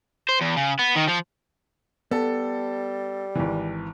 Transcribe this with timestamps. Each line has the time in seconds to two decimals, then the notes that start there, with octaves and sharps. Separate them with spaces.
0.29 C5
0.41 E2
0.56 C#3
0.79 B3
0.96 D#3
1.09 F3
2.11 G3 B3 A4
3.35 G#1 E3